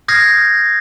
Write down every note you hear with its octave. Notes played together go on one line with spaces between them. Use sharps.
D#6 F6 G6 G#6 A#6 C7